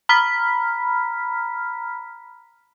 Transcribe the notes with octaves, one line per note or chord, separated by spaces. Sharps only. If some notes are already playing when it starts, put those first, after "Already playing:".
A#5 B5 F6 B6